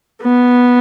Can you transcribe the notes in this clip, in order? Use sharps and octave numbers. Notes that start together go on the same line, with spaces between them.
B3